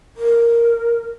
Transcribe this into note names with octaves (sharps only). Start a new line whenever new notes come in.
A#4